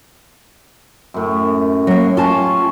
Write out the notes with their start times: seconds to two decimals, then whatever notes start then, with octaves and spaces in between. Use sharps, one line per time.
1.14 F#2 A2
1.87 F#3 A#3
2.17 C#4 F4 G4 A5